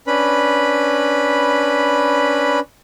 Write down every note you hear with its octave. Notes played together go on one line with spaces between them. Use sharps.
C#4 D4 B4 B5